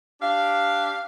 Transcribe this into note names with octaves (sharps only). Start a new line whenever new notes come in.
D4 G4 F5